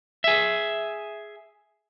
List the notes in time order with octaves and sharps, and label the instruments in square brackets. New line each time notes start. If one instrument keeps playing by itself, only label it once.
[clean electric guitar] G#4 E5